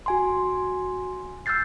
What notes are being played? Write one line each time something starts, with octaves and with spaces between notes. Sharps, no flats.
F#4 G#5 C6
E6 F6 G6 A6 C7